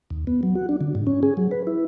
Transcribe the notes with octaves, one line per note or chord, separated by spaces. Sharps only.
D#2
B3
F#3
F#4
D4
D3
G#2
C#4
G#4
F#3
B4
E4